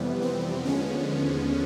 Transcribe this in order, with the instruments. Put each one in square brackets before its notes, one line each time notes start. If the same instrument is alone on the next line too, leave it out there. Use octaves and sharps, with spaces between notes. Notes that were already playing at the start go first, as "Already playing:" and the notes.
Already playing: [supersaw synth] F2 C3 E3 G3 B3
C4
D#2 D3 F3 G#3 B3 C#4